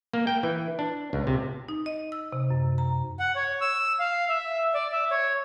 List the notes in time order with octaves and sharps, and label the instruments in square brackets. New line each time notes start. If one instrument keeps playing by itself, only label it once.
[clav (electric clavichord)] A#3
G5
E3
D4
C#2
C3
[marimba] D#4
D#5
E6
C3
F#2
A#5
[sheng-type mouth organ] F#5
C#5
E6
F5
E5
D5
E5
C#5